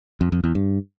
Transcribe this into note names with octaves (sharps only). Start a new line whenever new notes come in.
F2
F2
E2
G2